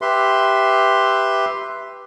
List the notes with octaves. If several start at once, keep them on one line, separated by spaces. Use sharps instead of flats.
G4 B4 E5 C6